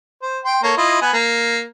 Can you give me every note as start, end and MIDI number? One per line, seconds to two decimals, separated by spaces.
0.22 0.39 72
0.45 0.62 79
0.45 0.62 84
0.63 0.72 58
0.63 0.72 69
0.63 0.72 73
0.77 1.00 64
0.77 1.00 65
0.77 1.00 75
1.01 1.13 59
1.01 1.13 71
1.01 1.13 80
1.14 1.63 58